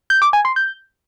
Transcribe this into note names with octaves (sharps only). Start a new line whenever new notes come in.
G6
D6
G#5
C6
G6